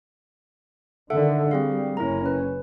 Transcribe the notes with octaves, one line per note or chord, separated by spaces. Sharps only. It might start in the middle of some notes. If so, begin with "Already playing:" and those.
D3 D#3 A4 E5 F#5
G3 C4 G#4 F5
F#1 C#4 E4 A#4 A#5
B4